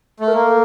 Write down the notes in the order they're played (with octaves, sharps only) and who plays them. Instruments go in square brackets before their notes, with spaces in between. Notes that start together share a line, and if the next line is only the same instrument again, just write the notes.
[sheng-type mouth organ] A3
[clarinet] A#4
[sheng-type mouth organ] A#3 [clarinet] A4